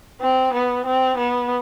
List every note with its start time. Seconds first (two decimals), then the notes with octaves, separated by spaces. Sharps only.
0.21 C4
0.54 B3
0.86 C4
1.18 B3